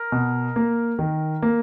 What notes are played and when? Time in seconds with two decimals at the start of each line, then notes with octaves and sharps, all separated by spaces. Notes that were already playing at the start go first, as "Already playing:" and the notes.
Already playing: A#4
0.12 B2
0.56 A#3
0.99 D#3
1.42 A#3